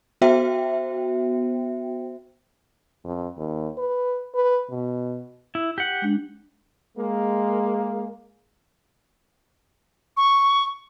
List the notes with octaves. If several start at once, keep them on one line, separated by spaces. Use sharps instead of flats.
B3 F#4 C5 E5 G5
F2
D#2
B4
B4
B2
E4
G4 F#5
G#3 D4
G#3 A#3
C#6